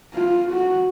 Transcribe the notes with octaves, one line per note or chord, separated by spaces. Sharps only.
F4
F#4